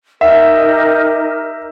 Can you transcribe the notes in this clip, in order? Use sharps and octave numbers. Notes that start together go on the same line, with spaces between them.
D#4 G4 A#4 E5